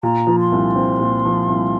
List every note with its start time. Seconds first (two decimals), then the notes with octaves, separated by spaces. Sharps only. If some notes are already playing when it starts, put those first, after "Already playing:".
0.03 A#2 A#5
0.27 F3
0.40 C6
0.52 C2
0.76 C4
1.00 A#2
1.25 F3
1.49 C2